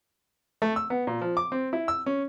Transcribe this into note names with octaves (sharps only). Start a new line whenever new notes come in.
A3
E6
B3
A#2
F3
D6
C4
E4
E6
C#4